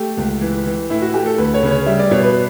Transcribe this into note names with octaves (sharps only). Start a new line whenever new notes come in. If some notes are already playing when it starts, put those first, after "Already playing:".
Already playing: A3 G4
C#2
E3
E3
A2 E4
F#4
A3 G4
A4
D2 B4
C#5
C#3 B4
C#5
G3 E5
D5
B2 C#5
B4